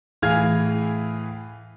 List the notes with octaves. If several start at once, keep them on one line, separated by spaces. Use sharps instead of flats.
A2 E3 G#4 F5 F6 G#6